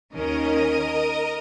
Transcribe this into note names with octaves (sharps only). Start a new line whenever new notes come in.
D#2 D#3 C#4 A#4 D#5